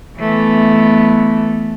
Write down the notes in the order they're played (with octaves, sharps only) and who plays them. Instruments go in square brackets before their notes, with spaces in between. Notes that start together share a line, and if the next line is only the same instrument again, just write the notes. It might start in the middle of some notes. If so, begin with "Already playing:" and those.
[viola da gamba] E3 A3 B3